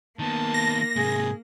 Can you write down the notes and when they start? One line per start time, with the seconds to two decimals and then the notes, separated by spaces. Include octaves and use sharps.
0.19 D#3 A#3 B3 A5
0.54 A#6
0.96 G#2 C3 G#4